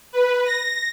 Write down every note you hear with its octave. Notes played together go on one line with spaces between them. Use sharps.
B4
A#6